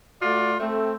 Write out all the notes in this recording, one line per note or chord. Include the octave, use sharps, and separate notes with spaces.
A3 F4 F#4 D5
A3 C4